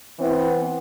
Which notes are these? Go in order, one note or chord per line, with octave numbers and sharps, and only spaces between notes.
E3 B3 C4 E4